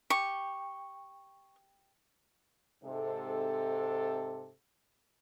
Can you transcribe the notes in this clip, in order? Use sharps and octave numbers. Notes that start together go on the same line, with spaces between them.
G4 C#6
G#2 C3 A4